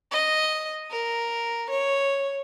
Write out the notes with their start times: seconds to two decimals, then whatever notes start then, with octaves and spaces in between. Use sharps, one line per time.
0.11 D#5
0.91 A#4
1.70 C#5